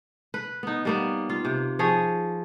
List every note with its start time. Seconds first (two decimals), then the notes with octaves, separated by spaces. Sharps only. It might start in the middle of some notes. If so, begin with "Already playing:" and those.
0.34 B4
0.63 B3 D#4
0.85 G3 A#3 B3
1.30 F4
1.45 C3
1.79 F3 G#4 C#5